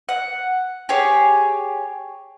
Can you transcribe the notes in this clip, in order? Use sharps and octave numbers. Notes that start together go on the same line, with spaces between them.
F#5
G4 G#4 C#5